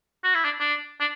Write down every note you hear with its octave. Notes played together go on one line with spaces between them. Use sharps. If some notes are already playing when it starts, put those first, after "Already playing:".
F#4
E4
D4
D4
D4